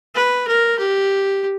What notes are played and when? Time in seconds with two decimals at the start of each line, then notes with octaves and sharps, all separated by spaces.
0.15 B4
0.47 A#4
0.78 G4